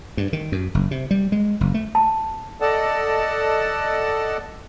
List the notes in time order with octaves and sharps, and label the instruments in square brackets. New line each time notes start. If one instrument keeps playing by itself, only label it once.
[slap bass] G2
D#3
F#2
F#1
C3
G3
G#3
F#1
A3
[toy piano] A5
[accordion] A4 D5 D#5 F#5 A5